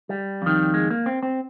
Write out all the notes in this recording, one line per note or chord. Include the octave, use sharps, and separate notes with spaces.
G3
F2 D#3
G#3
A#3
C4
C4